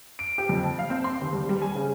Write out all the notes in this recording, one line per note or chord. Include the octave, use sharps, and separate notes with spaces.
D7
G4
F2
A5
F5
C4
C6
D#2
G3
G3
G#5
C#3